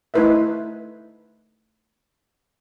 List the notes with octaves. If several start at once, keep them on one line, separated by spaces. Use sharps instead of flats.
A3 D#4 E4 B4 C5 E5